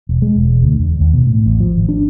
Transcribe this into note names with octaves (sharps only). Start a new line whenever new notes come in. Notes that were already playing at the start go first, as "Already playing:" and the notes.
E1
G#3
E1
D2
E2
D#2
B2
A2
A1
F3
G#1
D4